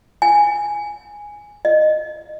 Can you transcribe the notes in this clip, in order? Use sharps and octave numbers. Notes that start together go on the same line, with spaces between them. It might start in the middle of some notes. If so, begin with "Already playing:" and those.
G#5
D#5